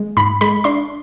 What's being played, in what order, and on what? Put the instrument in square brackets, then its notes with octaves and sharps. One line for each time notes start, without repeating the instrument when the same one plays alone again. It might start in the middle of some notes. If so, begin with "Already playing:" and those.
Already playing: [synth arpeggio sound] G#3
G#2 B5
G#3 B5
D4 C6